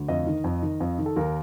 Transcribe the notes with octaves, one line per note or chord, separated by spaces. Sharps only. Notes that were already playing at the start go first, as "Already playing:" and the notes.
Already playing: D2
F2 D#5
D#3
F2
D#3
F2
D#3
A4
D#2 A#4